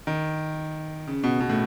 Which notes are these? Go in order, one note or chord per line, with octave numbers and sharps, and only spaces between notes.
D#3
C#3
B2
B2
A2